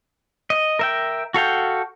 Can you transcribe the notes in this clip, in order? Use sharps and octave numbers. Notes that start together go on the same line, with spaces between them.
D#5
A#4 E5 G5
F#4 A4 F5 G5